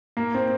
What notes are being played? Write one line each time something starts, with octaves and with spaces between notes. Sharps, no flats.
A#3
C4